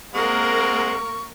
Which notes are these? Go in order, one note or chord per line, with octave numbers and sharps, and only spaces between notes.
G#3 A#3 C4 A#4 F#5 C#6